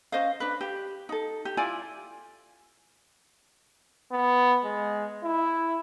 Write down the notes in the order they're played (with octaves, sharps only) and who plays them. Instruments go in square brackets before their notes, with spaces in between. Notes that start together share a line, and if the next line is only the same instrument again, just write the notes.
[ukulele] C#4 C5 D#5 F5
D4 B4
G4
D#4 A4
G4
E4 F4 D5 G#5
[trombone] B3
G#3
E4